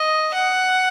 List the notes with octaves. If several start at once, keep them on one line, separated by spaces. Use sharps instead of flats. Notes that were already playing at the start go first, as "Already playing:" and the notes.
Already playing: D#5
F#5